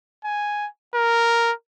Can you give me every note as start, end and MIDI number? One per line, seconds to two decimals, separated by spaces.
0.24 0.67 80
0.95 1.52 70